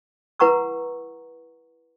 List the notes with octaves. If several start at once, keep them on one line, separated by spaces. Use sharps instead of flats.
E4 B4 F#5 A#5 C#6 E6